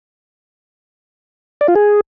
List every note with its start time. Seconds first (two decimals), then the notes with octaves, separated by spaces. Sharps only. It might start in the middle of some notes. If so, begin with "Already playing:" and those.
1.61 D5
1.68 F4
1.75 G#4